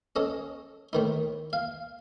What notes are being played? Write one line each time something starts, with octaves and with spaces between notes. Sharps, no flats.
C#4 A4 D#5
A2 D#3 D#4
F5